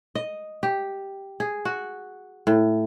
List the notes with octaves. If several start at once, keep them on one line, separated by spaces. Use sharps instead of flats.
D#5
G4
G#4
F#4
A2